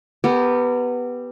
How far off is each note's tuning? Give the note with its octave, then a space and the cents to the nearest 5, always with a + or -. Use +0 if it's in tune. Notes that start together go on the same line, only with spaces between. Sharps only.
B3 +0 G4 +0 A#4 -35